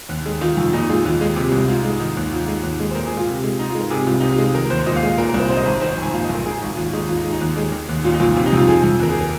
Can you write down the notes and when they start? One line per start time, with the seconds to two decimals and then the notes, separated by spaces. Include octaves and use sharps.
0.09 D#2
0.26 G#3
0.41 D#3 F4
0.57 F2
0.73 A#2 D#4
0.89 G#3 F4
1.05 D#2 F4
1.21 G#3
1.36 C3
1.52 C2
1.68 G#2 F4
1.85 G#3
2.00 D#3 D#4
2.17 D#2
2.32 G#2 F4
2.48 G#3
2.63 D#2
2.80 G#3
2.91 C5
2.95 A#2 A#4
3.06 G#4
3.12 G#3
3.17 F4
3.27 C3
3.44 G#3
3.59 G#2 D#4
3.70 F4
3.75 G#3
3.80 A#4
3.90 C3 G#4
4.06 C2 F4
4.20 C3 D#4
4.32 F4
4.38 G#3
4.54 D#3 A#4
4.70 D#2 C5
4.86 A#2 D#5
4.96 F5
5.03 G#3
5.18 A#2 A#4
5.29 A#4
5.34 C2 C5
5.50 G#2 C5
5.57 D#5
5.64 G#1 C5
5.81 D#3 C5
5.92 C5
5.97 F2 G#5
6.13 A#2 F5
6.24 D#5
6.29 A#1
6.35 A#4
6.45 G#2 G#4
6.61 G#1 D#4
6.77 D#2 F4
6.93 G#3 D#4
7.08 D#2 F4
7.17 D#4
7.25 G#3
7.33 D#4
7.41 D#2
7.57 G#3
7.72 D#3
7.89 D#2
8.04 A#2 F4
8.14 D#4
8.20 A#1 F4
8.36 C3 F4
8.46 D#4
8.52 F2 F4
8.68 F3 G#4
8.84 F2
9.00 D#2 A#4
9.10 G#4
9.21 A#4